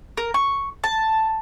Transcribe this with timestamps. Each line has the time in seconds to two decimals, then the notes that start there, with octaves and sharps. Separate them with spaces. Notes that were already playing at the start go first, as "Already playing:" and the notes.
0.17 A#4
0.34 C#6
0.84 A5